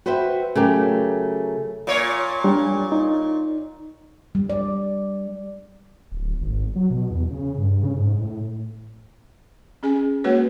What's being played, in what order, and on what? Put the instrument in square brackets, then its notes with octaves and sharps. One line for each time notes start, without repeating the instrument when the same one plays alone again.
[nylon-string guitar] F#4 B4 C5 E5 G5
C#3 F#3 A3 G4 A#4
[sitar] A#2 C#5
[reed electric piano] G3 D4
D#4
[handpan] G3
D5
[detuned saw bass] D1
G#1
F#3
B2
E2
C#3
G2
C#3
G#2
A2
[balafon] C#4 G#4 G#5
G#3 A#3 F#4 B4 C#5